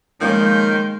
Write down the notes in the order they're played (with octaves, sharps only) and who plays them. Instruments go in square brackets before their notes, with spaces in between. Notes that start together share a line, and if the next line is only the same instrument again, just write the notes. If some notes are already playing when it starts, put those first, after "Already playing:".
[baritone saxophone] D#3 [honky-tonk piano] F3 A#3 C#4 [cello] G#3 [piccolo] G6